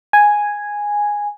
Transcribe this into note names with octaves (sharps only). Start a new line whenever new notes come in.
G#5